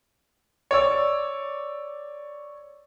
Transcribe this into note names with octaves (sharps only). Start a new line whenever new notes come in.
C#5 D5 E6